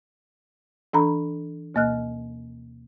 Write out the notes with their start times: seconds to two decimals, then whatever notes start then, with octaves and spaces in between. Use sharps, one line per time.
0.93 E3 D4 A4 A#5 B5
1.75 D2 B2 A#3 D#5 F6 F#6